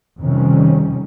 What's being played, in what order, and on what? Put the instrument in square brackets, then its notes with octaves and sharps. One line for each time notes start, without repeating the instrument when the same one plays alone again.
[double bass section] F2 C3 D#3 G3 C#4